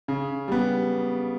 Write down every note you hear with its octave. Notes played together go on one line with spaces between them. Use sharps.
C#3
G3 B3